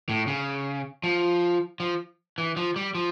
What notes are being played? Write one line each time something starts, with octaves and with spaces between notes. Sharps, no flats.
A2
C#3
F3
F3
E3
F3
G3
F3